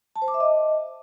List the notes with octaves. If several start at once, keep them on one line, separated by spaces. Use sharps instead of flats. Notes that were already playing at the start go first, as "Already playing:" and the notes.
A5
C5
D6
E5
D#5